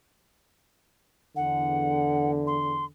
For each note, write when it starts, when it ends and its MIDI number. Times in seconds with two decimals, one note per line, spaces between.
1.36 2.90 40
1.36 2.90 50
1.36 2.31 78
2.47 2.85 84